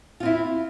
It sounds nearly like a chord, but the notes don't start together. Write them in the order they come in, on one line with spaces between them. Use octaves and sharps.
F4 C4 E4